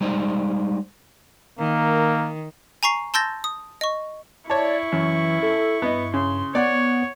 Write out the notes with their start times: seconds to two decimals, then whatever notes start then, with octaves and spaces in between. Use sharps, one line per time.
0.01 G3 G#3 D#4 C5 D5
1.59 D#3 A#3
2.83 G#5 A#5 C#6 C7
3.14 A5 C6 E6 G6 A6 A#6
3.44 D#6
3.81 D#5 C#6
4.50 E4 C#5 D5 A5 C#6
4.92 F#2 E3
5.42 A4
5.82 G2 B3 D#5
6.14 C#3 C6
6.55 B3 C#5 D5 F#5